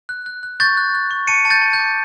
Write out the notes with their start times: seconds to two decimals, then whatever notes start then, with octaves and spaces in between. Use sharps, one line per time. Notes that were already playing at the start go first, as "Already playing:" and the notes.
0.09 F#6
0.26 F#6
0.43 F#6
0.60 C#6 G6 A6
0.77 F#6
0.95 F#6
1.11 C#6
1.27 A5 C#7 D#7
1.45 A5
1.50 G6 A6
1.61 A5
1.73 G6
1.78 D6